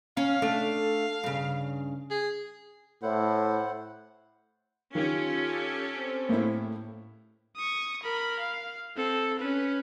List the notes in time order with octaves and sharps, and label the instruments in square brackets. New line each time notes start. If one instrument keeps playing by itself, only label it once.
[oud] C#4 [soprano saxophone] F5
[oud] A3 D4 D5
G2 C#3
[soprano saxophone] G#4
[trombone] A2 [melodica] E4 C5 F#5
[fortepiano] D#3 [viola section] C#4 G4 A4 [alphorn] F4
[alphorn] C4
[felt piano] A2 [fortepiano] A#3 E4
[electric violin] C#6 D#6
A#4 B5
F5
C4 A4
C#4 B4